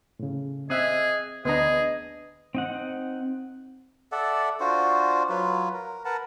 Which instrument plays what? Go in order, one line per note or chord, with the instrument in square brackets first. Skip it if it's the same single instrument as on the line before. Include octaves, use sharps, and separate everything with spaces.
[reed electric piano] A2 C#3
[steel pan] C4 E5 [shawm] G#4 [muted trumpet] D#5 [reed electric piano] D#6 F#6
[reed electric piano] D2 D4 [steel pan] B3 B4 A#5 [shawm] G#4 [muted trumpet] D#5
[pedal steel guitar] C4 D#4 F#5
[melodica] A4 D5 E5 F#5
D4 F4 F#4 C5
F#3 F4 B4
A#4
A#4 B4 F#5 A5